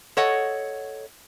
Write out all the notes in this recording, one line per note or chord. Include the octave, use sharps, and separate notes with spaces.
A4 C#5 D#5 F#5